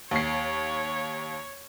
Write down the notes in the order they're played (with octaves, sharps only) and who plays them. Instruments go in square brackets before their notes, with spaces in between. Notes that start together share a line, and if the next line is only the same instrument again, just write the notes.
[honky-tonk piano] D#2 C7 [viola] C#5